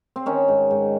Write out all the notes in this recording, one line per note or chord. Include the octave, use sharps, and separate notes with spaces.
C4
D#3 C#4
G#2
G#2